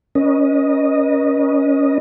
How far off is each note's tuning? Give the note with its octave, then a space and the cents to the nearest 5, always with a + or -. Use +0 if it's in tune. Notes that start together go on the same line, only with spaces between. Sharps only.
C#4 +10 B4 -45 D#5 -5